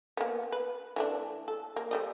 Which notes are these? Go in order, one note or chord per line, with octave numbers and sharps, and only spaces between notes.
A#3 B3
B4
E3 A3 D4
A4
A#3
G3 A3 D#5